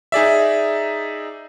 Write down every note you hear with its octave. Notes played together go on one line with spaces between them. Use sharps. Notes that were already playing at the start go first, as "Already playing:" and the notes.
D#4 G#4 D5 E5